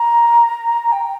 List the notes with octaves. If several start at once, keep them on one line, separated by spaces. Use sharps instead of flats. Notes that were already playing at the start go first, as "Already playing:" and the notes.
Already playing: A#5
G5